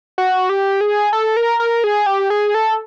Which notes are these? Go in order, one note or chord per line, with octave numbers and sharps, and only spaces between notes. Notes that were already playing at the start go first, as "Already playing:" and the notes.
F#4
G4
G#4
A4
A#4
A#4
G#4
G4
G#4
A4